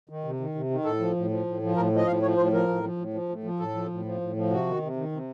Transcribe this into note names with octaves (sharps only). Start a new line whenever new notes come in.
D#3
C3
D#3
C3
D#3
A2 A4
F3
A2
F3
A2
F3
A2 A#4
F3 D#5
A2 F5
F3 C#5
A2 C5
F3 A#4
A2
F3
A2
F3
A2
F3
A2 A4
F3
A2
F3
A2
F3
C3 F#4
D#3
C3
D#3
C3